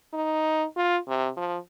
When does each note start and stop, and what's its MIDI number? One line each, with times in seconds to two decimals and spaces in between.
0.13 0.65 63
0.76 0.98 65
1.08 1.29 48
1.37 1.57 53